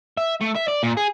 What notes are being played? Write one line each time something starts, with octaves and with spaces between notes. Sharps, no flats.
E5
A3
E5
D5
A#2
G#4